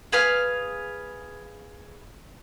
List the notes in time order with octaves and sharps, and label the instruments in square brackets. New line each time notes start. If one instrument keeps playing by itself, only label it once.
[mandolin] G#4 B4 F5 F6